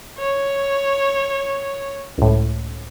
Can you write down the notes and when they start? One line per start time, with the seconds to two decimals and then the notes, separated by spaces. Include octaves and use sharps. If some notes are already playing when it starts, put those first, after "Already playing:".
0.18 C#5
2.18 C#2 A2